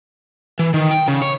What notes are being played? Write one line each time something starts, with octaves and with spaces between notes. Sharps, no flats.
E3
D#3
G5
C#3
C#5